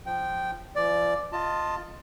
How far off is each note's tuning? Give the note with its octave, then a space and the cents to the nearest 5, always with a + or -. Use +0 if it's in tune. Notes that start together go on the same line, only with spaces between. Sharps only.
F3 +0 G5 -10
F3 -40 D5 +0
F4 +0 D#5 +0 A5 +20